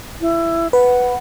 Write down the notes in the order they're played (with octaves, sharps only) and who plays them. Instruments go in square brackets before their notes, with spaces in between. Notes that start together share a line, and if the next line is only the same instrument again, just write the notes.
[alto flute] E4
[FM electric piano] B4 [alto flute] F#5